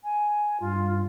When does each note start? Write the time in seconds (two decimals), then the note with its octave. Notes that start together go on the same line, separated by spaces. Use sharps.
0.04 G#5
0.60 G2 F4